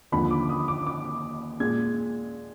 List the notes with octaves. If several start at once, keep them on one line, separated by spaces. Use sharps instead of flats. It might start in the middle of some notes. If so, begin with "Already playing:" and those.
D#2 D3 F3 B5
D6
D#6
D6
D6
A#2 G#3 G#6